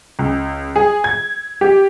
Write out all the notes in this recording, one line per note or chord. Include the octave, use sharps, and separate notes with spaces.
C#2
G#4
G#6
G4